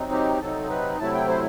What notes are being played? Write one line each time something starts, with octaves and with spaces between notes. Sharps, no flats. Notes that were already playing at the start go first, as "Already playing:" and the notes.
Already playing: C3 F#3 C4 D#4
G4
C3 F#3 C4 D#4 A4
B4
C3 F#3 A3 E4 A5
G5
C5